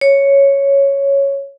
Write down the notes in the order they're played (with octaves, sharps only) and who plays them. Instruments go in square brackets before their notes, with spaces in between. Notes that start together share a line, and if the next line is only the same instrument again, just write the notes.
[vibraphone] C#5